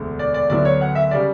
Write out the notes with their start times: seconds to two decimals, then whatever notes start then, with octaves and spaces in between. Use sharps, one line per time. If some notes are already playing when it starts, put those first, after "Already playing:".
Already playing: E1 D2 D3
0.19 D5
0.34 D5
0.50 D2 D3 F#3 B3 E4 D5
0.65 C#5
0.81 F#5
0.95 E5
1.11 C#3 G3 D5